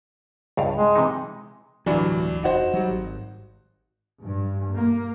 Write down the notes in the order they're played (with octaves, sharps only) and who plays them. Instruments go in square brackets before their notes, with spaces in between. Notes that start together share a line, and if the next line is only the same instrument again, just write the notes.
[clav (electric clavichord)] C#2 G2 F5
[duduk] G#3
[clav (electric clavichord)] C3 E3 D#4
[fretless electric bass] D1 D2 F#3 [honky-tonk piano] G2 E3 D4
[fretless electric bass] F1 [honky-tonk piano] D#4 F#4 C5
[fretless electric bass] F#3 G3
G#1
[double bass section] G2
A#3